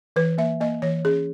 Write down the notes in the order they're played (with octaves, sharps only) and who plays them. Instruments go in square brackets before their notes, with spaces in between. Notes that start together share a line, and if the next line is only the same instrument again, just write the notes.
[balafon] E3 B4
A#3 E5
A#3 D#5
E3 C#5
C#4 G#4